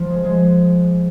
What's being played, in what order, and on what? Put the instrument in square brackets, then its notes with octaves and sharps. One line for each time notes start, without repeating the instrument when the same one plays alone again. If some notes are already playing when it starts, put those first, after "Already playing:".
Already playing: [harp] F3
G#3
G#3